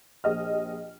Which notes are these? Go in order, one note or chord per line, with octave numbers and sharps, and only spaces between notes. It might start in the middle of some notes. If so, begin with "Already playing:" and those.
A#1 G4 D#5 F6